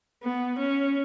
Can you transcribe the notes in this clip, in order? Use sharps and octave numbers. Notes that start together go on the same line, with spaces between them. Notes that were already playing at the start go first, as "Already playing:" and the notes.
B3
C#4